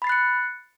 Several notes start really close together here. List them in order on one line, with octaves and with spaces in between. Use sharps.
B5 A6 C7 F#6 C#7